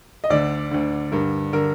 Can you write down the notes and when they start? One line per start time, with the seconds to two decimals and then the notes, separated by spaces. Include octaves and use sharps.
0.24 D#5
0.30 D2 D3 D5
0.71 D2 D3
1.12 G2 D3 A#4
1.53 D3 A#4